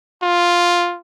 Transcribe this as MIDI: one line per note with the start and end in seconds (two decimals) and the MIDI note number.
0.23 0.97 65